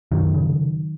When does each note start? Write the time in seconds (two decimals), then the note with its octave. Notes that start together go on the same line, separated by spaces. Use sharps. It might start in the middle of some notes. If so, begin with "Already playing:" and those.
0.12 F#2 D#3 F#3
0.34 C#3